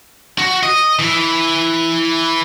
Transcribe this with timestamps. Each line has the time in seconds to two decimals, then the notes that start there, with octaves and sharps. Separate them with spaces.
0.38 F#4
0.63 D#5
0.99 E3